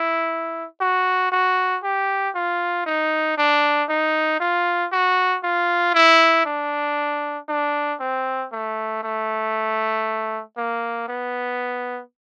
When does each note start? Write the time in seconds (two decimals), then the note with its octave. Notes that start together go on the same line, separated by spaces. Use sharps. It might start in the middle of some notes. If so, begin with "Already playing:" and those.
Already playing: E4
0.81 F#4
1.32 F#4
1.83 G4
2.35 F4
2.86 D#4
3.37 D4
3.89 D#4
4.40 F4
4.92 F#4
5.43 F4
5.94 E4
6.46 D4
7.49 D4
8.00 C4
8.52 A3
9.03 A3
10.57 A#3
11.08 B3